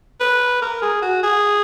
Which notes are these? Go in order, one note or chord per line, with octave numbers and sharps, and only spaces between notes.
B4
A#4
G#4
F#4
G#4